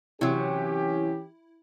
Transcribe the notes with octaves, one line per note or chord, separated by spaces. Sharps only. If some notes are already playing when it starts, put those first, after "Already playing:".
C3 E3 F#3 C#4 E4 G4